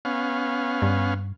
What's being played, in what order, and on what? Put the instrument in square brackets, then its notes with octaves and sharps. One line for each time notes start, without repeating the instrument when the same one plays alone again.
[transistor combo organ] B3 C#4 F5
[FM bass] G2